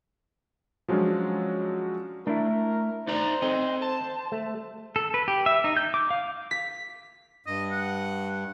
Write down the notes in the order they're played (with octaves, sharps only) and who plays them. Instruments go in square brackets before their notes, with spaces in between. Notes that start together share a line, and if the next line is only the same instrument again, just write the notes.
[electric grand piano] F3 F#3 G#3 C#4 D4
[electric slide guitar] A3 [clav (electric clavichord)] D4 E4 [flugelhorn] A#4
[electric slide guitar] D#4 D5 A#5 [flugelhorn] C5
[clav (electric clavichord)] C4 [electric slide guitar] A4 D#5
[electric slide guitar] A5
[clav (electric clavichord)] A3
[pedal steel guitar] A4
B4
G4
E5
D#4
G6
D6
F5
[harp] B6
[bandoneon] G2 [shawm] D#5
[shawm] F#5